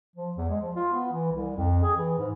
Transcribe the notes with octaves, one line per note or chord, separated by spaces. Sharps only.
F3
E2
G#3
F3
F4
B3
E3
C2
F2
G#4
E3
G#2